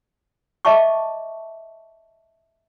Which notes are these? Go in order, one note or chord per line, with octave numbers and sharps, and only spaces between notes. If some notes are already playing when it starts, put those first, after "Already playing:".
D#5 E5 A5 C#6 D6